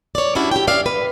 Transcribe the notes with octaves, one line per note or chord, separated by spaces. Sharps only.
C#5 D5
G3 C#4 D4 E4 F#4
G4 G5
C#4 D5 E5 F5
B4